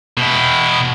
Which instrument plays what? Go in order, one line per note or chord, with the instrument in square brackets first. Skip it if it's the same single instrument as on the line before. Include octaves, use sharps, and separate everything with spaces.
[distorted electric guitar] B2 E4